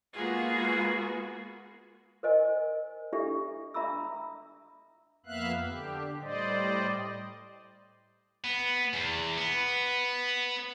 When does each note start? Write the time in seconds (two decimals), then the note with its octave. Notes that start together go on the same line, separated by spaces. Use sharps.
0.15 G#3 A#3 B3 F4 F#4 G#4
2.23 A#4 C5 D#5 G#5
3.13 D4 E4 G4 A4 E5
3.74 D4 E5 A#5 B5 D#6 E6
5.26 F2 A#3 B3 E5 F5 F#6
5.68 D3 G4
6.22 A2 G3 C5 D5 D#5
8.44 B3
8.93 E2
9.38 B3